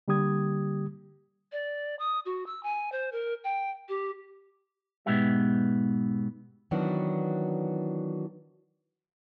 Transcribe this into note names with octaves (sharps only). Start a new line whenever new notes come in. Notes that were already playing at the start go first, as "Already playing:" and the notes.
D3 G3 A#3 G4 D#6 G#6
D5
D#6
F#4
E6
G#5
C5
A#4
G5
G4
G#2 B2 G#3 B3 G4 E5
D#3 E3 F#3 B3 D4 F#4